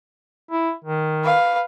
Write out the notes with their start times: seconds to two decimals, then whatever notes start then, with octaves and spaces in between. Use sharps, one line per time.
0.51 E4
0.84 D#3
1.24 B4 F5